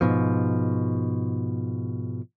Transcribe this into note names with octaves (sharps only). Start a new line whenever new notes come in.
G#2 B2 F3